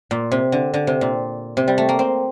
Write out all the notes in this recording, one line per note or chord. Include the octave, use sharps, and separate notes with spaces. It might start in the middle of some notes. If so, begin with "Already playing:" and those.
A#2
C3
D3
D3
C3
A#2
C3
G3
A3
A#3
C4